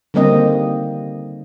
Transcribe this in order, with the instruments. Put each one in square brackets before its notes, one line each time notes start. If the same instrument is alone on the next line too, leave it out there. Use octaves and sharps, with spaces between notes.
[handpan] D3 D#3 G3 A#3 C4 D#5